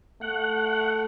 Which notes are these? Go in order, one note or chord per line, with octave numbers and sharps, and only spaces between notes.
A3 F#5